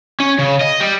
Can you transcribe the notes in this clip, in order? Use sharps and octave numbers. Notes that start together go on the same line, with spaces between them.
C#4
C#3
D#5
G3